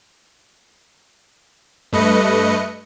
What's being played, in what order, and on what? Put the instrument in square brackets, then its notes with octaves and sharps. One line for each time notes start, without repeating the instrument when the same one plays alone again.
[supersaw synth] G2 A3 B4 D#5 C#7